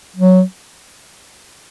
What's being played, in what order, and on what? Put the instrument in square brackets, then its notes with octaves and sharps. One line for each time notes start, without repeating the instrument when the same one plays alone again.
[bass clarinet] F#3